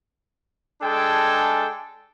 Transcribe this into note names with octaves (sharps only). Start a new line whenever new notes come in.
G#3 D4 G#4 A4 G5 G#5